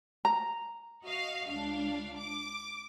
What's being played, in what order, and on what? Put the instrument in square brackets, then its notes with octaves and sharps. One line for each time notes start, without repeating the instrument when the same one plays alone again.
[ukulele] A#5
[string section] F#4 D#5 F5
C#2 D4 F5
D6